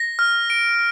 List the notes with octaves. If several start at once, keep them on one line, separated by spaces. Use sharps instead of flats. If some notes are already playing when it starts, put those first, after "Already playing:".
Already playing: A#6
F6
D7